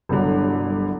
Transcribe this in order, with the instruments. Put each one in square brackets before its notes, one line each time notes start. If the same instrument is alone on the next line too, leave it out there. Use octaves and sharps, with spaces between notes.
[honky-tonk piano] G1 C2 G2 D3 F#3